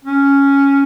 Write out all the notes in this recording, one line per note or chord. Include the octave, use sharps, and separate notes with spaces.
C#4